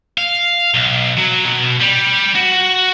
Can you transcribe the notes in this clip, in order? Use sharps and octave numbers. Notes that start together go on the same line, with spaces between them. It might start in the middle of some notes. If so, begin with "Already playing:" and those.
F5
B1
F#3
B2
G3
F#4